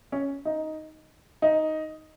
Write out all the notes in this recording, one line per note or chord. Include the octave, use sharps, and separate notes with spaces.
C#4
D#4
D#4